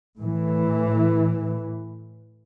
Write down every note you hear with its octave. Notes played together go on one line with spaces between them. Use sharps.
A2 E3